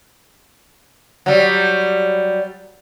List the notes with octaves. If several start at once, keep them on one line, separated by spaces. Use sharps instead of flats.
F#3 G3